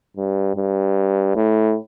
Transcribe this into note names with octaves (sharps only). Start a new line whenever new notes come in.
G2
G2
A2